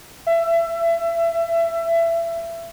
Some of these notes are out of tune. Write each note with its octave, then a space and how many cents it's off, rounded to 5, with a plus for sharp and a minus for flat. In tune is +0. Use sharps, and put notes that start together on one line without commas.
E5 +25